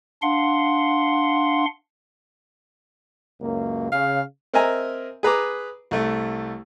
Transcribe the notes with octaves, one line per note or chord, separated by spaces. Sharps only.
D4 F5 F#5 C6
C#2 F#2 A#3
C#3 F5
C4 A#4 D#5 E5 G#5 A#5
G#4 B4 A#5 D6
C2 A3